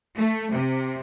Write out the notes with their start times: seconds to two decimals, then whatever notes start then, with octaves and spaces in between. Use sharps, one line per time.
0.18 A3
0.53 C3